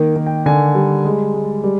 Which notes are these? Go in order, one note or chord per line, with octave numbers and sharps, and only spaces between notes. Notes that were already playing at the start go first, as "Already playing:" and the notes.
Already playing: D#3 A#3
D#3
G5
D3 G#5
G3
G#3
G#3
G3